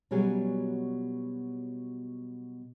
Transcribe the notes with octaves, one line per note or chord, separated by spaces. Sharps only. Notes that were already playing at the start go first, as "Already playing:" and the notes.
B2 F#3 G3 C#4 G#4